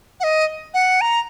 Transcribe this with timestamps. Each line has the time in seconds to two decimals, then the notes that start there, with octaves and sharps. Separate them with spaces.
0.20 F#5
0.24 D#5
0.74 F#5
1.01 A#5